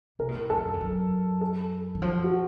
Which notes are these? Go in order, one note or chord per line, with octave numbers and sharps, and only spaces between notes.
C3 A#4
A#2
A2
F#2 A4
F#2
F2
F#2
A4
D#3
F3 F4
F#4